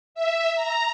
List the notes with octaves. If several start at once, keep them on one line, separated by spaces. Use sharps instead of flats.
E5
A#5